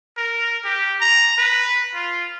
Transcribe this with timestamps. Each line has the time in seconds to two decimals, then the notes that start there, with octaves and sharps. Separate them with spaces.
0.17 A#4
0.65 G4
1.01 A#5
1.38 B4
1.94 F4